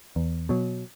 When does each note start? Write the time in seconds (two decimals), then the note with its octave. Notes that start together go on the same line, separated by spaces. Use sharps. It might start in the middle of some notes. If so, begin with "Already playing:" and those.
0.16 E2
0.49 B2 F#3